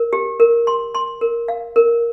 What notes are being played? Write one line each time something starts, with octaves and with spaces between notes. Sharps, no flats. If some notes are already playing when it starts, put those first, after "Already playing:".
Already playing: A#4
G4
A#4
C6
C6
A#4
F5
A#4